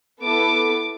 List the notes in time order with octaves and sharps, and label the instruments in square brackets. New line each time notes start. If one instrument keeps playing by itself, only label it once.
[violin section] B3 E4 A4 D6